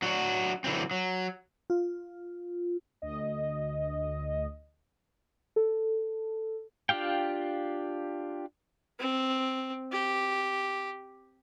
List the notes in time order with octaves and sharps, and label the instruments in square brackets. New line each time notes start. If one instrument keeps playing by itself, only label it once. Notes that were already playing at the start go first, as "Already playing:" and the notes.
[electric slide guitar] F#3 D4 F#4
D3 E3 F#3 C4
F#3
[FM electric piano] F4
[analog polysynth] D2 D#5
[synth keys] A4
[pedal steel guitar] D4 F4 G4 F5 G5
[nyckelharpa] C4
G4